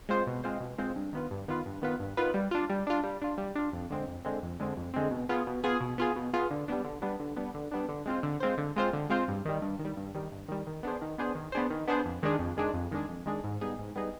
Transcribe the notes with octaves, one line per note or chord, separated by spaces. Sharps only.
G#3 C4 F4 C5
B2
G#3 C4 F4 C5
B2
G#3 C4 F4 C5
G2
D#3 B3 F4 B4
G2
D#3 B3 F4 B4
G2
D#3 B3 F4 B4
G2
D#3 B3 F4 B4
G3
D4 F4
G3
D4 F4
G3
D4 F4
G3
D4 F4
F2
D3 G#3 C4
F2
D3 G#3 C4
F2
D3 G#3 C4
F2
D3 G#3 C4
B2
B3 F4 G#4
B2
B3 F4 G#4
B2
B3 F4 G#4
B2
B3 F4 G#4
D3
G3 B3 D4
D3
G3 B3 D4
D3
G3 B3 D4
D3
G3 B3 D4
D3
G#3 C4 F4 C5
D3
G#3 C4 F4 C5
D3
G#3 C4 F4 C5
D3
G#3 C4 F4 C5
G2
D#3 G3
G2
D#3
G3
G2
D#3 G3
G2
D#3 G3
D#3
B3 D4 G#4 C5
D#3
B3 D4 G#4 C5
D#3
B3 D4 G#4 C5
D#3
B3 D4 G#4 C5
F2
D#3 G#3 D4 G#4
F2
D#3 G#3 D4 G#4
F2
D#3 G#3 D4 G#4
F2
D#3 G#3 D4 G#4
G#2
G3 B3 D#4 G#4
G#2
G3 B3 D#4 G#4